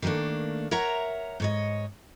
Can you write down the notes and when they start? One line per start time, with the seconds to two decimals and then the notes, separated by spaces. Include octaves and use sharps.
0.02 D#3 G3 A3 A#3 D4
0.71 A#4 C#5 E5 F#5 A#5
1.40 G#2 C#5 D#5